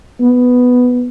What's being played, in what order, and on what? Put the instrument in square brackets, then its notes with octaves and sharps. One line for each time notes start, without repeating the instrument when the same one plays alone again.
[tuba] B3